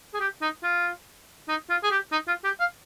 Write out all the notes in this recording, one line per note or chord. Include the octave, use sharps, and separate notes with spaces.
G#4
G4
D#4
F4
D#4
F4
G#4
G4
D#4
F4
G4
F5